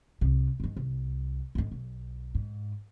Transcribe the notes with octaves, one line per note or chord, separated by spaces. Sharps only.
C2 C3
G2 D#3
C2
D2 G#2
B1
G#2